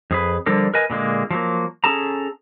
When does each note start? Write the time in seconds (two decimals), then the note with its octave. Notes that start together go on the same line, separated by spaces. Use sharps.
0.11 F2 G#4 B4
0.46 D3 F3 G3 D4 A4 A#4
0.74 A#4 B4 D#5 G#5
0.90 A#2 D3 G#3 A#3
1.31 F3 F#3 A#3
1.84 C#4 G#4 A4 A5 A#5